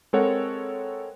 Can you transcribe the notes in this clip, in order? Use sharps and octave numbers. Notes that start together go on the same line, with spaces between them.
G#3 C4 A4 A#4 C#5 F#5